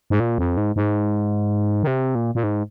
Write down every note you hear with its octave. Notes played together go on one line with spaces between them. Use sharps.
G#2
A#2
F2
G#2
G#2
D#3
C3
A#2
A#2
G#2